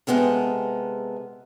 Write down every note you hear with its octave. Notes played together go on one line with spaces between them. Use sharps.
C3 F3 G#3 B3 A4 A#4